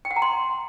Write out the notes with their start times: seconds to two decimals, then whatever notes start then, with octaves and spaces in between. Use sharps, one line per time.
0.05 G5
0.11 F#5
0.16 A#5
0.22 C6